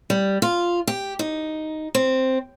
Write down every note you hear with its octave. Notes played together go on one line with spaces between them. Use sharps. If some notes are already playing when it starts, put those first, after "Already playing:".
G3
F4
G4
D#4
C4